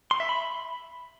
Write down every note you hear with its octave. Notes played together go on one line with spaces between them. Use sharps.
C6
E5
B5